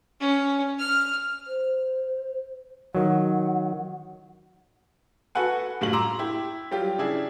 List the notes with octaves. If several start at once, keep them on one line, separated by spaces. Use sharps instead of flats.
C#4
F6
C5
D#3 F#3 F#5
F#4 A4 B4 F#5 G#5
F#1 A2 G3 F4 F#4 F#7
A#5 C6 D6 E6
E4 G4
F#3 G3 F4 G4
C#3 D4 E4 G#4